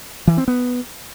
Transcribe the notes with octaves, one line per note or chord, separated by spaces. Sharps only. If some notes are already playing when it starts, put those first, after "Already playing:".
E3
C4
B3